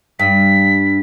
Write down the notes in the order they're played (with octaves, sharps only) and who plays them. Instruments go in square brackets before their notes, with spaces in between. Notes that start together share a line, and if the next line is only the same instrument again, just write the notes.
[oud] G2 [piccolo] B6